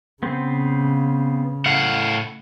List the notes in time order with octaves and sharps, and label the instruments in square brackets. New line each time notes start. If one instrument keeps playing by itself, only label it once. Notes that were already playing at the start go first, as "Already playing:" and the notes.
[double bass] C#3 [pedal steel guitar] B3 C4 C5
[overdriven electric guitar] A2 F#5 [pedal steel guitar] F5